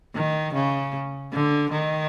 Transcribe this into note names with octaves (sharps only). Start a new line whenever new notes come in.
D#3
C#3
D3
D#3